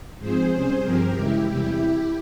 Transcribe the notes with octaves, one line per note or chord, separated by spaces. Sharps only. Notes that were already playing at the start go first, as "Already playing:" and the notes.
G#2 F3 C4 G#4 C5
C3 G3 C#4 G#4 C5
G2 F3 C4 G4 A#4
C#3 E3 G#3 E4 G4
E2 C3 E3 G3